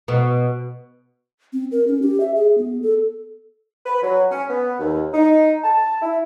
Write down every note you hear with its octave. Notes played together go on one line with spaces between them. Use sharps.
B2
C4
A#4
C#4
G4
E5
G#4
B3
A4
B4
F#3
C#4
B3
D#2
D#4
A5
E4